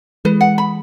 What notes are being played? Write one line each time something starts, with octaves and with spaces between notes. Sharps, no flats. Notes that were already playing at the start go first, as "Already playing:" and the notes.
E3 G#3 B4
F#5
B5